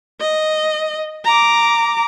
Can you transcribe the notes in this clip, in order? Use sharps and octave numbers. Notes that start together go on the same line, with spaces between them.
D#5
A#5 D6